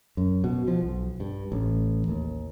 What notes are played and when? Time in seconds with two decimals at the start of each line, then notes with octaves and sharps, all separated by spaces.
0.17 F#2
0.44 B2
0.68 F3
0.83 B1
1.20 G2
1.52 A1
2.08 D#2